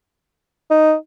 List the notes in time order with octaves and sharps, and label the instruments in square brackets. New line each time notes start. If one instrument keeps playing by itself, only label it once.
[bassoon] D#4